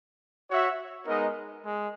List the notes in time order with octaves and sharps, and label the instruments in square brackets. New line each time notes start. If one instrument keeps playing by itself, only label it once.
[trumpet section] F#4 C#5 E5
G#3 B3 D#4 A#4 D#5
G#3